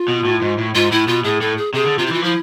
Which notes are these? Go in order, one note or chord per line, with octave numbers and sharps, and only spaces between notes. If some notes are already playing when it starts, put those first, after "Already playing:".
Already playing: F4
B2
A2
G#2
A2
G#2 F4
A2 E4
B2 F4
A2 G#4
A2 A4
G#4
C3 G#4
D3
C3 F4
E4
E3 F4
F3 E4